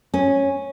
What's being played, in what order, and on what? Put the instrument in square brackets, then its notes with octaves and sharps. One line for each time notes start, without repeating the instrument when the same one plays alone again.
[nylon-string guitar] C#4